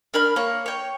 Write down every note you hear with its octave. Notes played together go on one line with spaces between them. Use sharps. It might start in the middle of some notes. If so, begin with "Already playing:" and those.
D4 A#4 B5 F6
A#3 C#5
C#5 G5